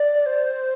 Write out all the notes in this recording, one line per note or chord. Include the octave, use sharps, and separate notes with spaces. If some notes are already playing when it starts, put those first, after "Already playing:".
Already playing: D5
C5